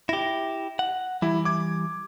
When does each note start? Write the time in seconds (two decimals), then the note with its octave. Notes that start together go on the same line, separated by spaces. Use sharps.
0.09 E4 G4 A#6
0.79 F#5
1.22 E3 G3 E4
1.45 D6 G#6